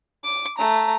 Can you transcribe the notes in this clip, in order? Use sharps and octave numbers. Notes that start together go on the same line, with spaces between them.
D6
A3 A#5